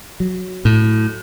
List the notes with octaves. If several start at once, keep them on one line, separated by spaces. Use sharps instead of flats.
F#3
A2